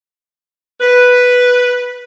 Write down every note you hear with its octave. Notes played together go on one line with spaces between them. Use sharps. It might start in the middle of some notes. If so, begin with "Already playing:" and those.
B4